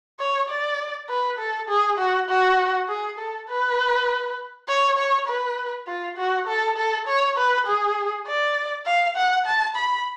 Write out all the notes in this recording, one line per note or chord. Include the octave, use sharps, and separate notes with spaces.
C#5
D5
B4
A4
G#4
F#4
F#4
G#4
A4
B4
C#5
C#5
B4
F4
F#4
A4
A4
C#5
B4
G#4
D5
F5
F#5
A5
B5